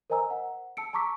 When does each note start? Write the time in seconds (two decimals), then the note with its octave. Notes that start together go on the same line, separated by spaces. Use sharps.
0.10 A#4 C5 D#5 G#5 A#5 E6
0.30 F#5
0.77 A5 E6 C#7 D7
0.93 A5 A#5 C#6 D6 E6 B6